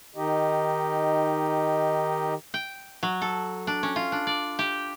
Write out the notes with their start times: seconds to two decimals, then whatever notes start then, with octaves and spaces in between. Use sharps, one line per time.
0.16 D#3 D#4 G4 D#5
2.54 G5
3.03 F#3
3.22 A4
3.67 D4
3.83 C#4
3.96 F4
4.12 D4
4.27 D5
4.59 G4